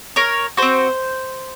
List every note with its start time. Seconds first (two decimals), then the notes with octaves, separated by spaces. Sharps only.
0.16 A#4 C#5
0.57 C4 F#4 C5